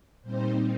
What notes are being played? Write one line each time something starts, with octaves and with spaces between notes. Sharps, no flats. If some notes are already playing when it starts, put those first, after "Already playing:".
A#2 G3 C4 D#4 C5